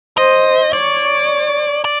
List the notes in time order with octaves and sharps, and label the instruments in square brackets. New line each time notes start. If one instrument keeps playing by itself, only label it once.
[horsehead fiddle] C5 [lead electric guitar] D#5
[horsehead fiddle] C#5 [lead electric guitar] D5
[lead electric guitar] D5